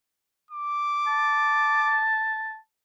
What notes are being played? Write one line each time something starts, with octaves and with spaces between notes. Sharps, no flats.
D6
A5